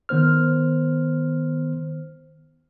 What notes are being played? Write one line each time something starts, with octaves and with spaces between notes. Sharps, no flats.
D#3 B3 C5 F6